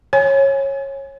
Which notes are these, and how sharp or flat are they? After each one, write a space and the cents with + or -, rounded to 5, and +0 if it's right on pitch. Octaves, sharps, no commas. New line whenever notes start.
C#5 -20 G#5 +0